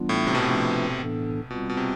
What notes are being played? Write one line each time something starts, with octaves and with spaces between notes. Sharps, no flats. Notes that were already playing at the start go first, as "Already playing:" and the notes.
Already playing: E3 G3 B3 D4 F4
A2
C3
B2
C3 F3 A3 D4 F4 B4
A2 E3 B3 D4 A4
B2 G3 C4 F4
B2
C3